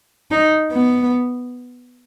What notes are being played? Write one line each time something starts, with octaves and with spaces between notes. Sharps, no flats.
D#4
B3